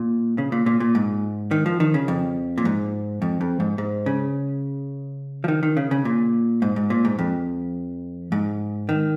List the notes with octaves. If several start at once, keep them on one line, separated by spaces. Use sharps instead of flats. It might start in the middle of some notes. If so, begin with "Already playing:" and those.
Already playing: A#2
C#3
A#2
A#2
A#2
G#2
D#3
F3
D#3
C#3
F2
A#2
G#2
F2
F2
G#2
G#2
C#3
F3
D#3
D#3
C#3
C#3
A#2
G#2
G#2
A#2
G#2
F2
G#2
D#3